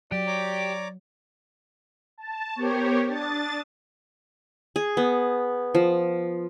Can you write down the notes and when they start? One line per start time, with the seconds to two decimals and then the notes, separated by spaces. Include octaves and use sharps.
0.12 F#3 G4 D5
0.27 C#5 A#5 D6
2.18 A5
2.55 B3 G4 A#4 C5 C#5
3.08 D4 A5 D#6 A6
4.76 G#4
4.97 B3
5.75 F3